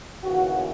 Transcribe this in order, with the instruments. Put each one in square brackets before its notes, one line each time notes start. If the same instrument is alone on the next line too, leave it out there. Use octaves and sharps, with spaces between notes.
[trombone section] D#2 C#3 E3 F#4